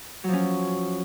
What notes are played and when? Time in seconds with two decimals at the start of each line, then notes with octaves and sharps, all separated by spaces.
0.24 F#3
0.28 F3
0.33 C#4